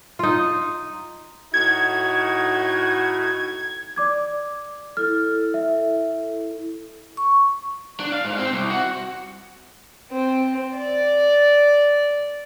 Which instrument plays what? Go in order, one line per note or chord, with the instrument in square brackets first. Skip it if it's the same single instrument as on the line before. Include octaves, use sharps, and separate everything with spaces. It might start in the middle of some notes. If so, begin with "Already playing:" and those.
[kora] D#4 F4
[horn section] A2 D#4 F#4 [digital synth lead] G#6
[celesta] D5 D6 G#6
[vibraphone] E4 A4 [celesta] F6
[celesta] E5
[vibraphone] C#6
[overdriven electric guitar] D4
F5
G#2
C4
C2
F#4
[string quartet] C4
D5